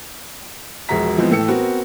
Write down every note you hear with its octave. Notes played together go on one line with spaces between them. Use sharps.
E1 A#1 F#4 G#4 A#5 B6
E3 F3 G#3 B3 C4
A2 E3 A4 G5 C#7
B3 C4 F#4 A#4